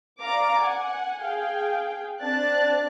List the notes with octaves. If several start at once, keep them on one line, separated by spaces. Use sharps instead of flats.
D5 F5 A#5 D6
F#5 G#5
G#4 F5 G5
C4 D4 D5 F#6 A6